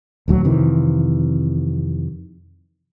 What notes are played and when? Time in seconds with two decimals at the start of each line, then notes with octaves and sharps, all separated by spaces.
0.28 D#1 D2 F#3
0.44 F2 C3 D#3 E3